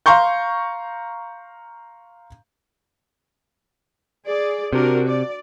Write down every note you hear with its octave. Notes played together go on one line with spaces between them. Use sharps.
F5 A#5 C6 C#6 G6
G#4 D5
C3 D4 F#4 A#4
D5